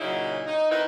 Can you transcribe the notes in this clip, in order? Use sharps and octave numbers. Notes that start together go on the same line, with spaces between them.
A#2 C#3 F#3 D#4 E4
D#4
D#3 C4 D#4 E4 B4